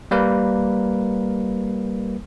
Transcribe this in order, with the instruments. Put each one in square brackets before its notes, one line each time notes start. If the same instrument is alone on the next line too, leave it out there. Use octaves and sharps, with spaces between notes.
[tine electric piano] G3 A#3 A#4 B4